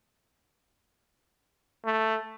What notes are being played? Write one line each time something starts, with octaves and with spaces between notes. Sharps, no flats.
A3